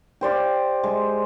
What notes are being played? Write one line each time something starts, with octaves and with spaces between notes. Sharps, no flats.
G4 C5 D5 F5
G#3